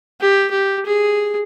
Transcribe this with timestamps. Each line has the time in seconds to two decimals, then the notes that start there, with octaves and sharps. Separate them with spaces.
0.21 G4
0.51 G4
0.86 G#4